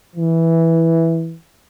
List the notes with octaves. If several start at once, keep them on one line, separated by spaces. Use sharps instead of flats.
E3